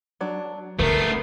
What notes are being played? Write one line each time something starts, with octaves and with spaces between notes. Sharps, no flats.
F#3 D4
D3 A3 B3 A#4 B4 G6 C7